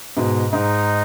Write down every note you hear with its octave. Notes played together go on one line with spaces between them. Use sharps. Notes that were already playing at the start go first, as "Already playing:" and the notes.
G#2 B2
G#2 D#4